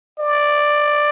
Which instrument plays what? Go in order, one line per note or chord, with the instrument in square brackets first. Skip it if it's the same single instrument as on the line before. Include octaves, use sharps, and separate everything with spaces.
[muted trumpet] D5